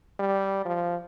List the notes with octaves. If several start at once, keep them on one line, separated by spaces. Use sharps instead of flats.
G3
F3